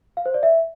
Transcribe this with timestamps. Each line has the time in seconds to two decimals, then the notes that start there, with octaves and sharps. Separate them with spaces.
0.17 F5
0.26 C5
0.34 D5
0.43 E5